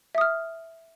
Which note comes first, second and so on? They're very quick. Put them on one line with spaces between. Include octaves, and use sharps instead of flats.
E5 D#6 F6